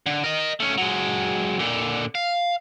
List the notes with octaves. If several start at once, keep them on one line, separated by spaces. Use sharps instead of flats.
D3
A#4 D#5
A3 C#4
F#3 G#3
A#2 D3
F5